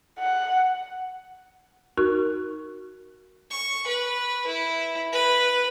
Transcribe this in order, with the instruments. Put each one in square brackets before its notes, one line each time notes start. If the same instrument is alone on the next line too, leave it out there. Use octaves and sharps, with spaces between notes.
[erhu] F#5
[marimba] D#4 F#4 A#4 C#6 F#6
[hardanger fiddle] C#6
B4
E4
B4